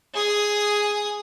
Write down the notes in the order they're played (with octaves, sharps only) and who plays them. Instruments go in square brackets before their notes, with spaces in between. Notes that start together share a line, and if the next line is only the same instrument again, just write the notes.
[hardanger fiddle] G#4 D#6